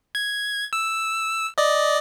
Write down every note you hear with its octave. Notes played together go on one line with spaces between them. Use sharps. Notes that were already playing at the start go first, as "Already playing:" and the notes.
G#6
E6
D5 D#5